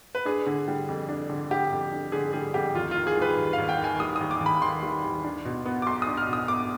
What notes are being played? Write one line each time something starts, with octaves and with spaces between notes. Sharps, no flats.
B4
D4 G#4
D3
G3
F2
D4
D3
G3 G4
F2
D4
D3 G#4
G3 G#4
F2 G4
D#2 F4
D#3 F4
G#4
G3 B4
D#2
F5
D#2
G5
D#3
G#5
G3 D#6
D#2 D#6
D6
D#2
B5
D#3 C6
G3
D#2
D4
B2
B3
D6
B1 C6
D#6
D4
F6
B2 D#6
B3 D6